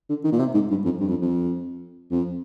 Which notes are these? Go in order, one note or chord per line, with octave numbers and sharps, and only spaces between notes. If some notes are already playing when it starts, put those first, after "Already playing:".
D3
D#3
A#2
C3
G#2
G2
F2
G2
F2
F2
F2